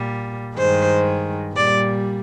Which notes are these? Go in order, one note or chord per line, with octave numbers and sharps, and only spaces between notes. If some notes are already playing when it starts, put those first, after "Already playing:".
Already playing: A#2 G3
G2 D#3 G#3 C5
A#2 G3 D5